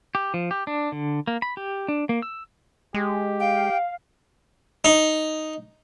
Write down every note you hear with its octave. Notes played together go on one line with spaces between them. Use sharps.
G4
F3
G4
D4
D3
A#3
B5
G4
D4
A#3
E6
G#3 G4
F5 G5
D#4